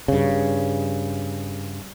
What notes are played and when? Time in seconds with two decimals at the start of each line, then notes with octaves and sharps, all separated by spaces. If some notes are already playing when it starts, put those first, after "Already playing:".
0.08 G2 C#3